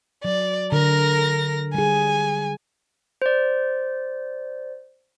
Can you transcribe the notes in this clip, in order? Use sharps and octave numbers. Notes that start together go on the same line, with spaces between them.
F#3 D5
D3 A#4 A#6
G3 G#4 G#5
C5 D5